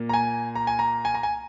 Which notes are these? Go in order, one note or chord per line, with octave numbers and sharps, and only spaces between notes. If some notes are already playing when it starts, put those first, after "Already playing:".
Already playing: A#2 A#3
A#5
G#5
A#5
G#5
A#5
G#5
A#5
G#5